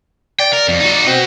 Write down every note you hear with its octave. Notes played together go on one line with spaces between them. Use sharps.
D5 G5
A#4
F2
D#4 F#4
C4 F#4 D#5